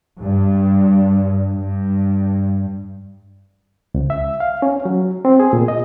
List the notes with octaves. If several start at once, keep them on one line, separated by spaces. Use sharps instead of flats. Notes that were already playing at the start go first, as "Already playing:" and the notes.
G2
G2
C#2
E5
F5
C#4
F#3
C4
G#4
A#2
D#5